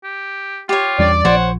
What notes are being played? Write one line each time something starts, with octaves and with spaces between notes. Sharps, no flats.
G4
F4 G4 C#5
E2 G3 D4 D5
A#1 F3 C5 C#5 F#5